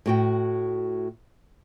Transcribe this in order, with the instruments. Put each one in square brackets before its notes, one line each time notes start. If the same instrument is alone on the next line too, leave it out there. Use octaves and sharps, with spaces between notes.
[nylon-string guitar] A2 F#4 G5